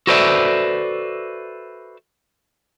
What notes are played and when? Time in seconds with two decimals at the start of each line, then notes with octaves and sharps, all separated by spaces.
0.07 F#4 A4 B4 C5 D5 E5